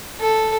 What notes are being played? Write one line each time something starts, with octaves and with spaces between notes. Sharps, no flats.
A4